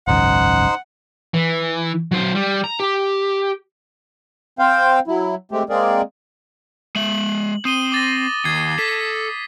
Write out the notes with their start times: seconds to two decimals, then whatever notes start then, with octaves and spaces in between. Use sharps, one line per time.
0.08 G#1 C#2 F#2 D#4 C5 F#5
1.34 E3
2.12 F#3 C5
2.35 G3
2.64 A#5
2.80 G4
4.59 C4 C5 F5 G5
5.07 F#3 E4
5.52 G#3 A3 C4 G4
5.69 G#3 A#3 C4 G#4 A#4 D5
6.96 G#3 E5 F#7
7.65 C4 D#6 D#7 G7
7.92 D6 A6 A#6
8.45 D#2 G#6 C7
8.79 A4 B6